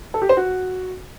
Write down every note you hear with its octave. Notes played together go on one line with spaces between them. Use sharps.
A4
G4
C5
F#4